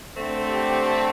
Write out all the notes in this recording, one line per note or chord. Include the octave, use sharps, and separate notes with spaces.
D3 A3 C4
G4
A4